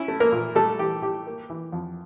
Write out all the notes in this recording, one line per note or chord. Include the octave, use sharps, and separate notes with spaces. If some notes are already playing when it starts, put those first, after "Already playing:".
Already playing: C#4 E4
A3
A#3 A#4
A#2
G3 A3 A4
E3 G4
A2 G4
A#3
E3
F2